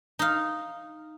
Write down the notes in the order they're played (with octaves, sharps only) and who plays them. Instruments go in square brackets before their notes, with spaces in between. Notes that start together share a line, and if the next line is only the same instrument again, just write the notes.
[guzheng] D#4 F5